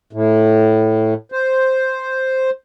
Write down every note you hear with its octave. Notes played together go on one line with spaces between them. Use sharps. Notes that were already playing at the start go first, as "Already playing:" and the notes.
A2
C5